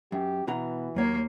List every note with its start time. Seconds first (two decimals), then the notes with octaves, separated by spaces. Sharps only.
0.12 F#2 G4
0.47 B2 E3 F#4 A#5
0.96 D#2 F#3 A#3 C#5